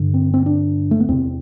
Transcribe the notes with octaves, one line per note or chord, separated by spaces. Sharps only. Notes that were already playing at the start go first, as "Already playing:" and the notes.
Already playing: G2 D3
C4
C4
D4
A3
B3
E2 C3 C4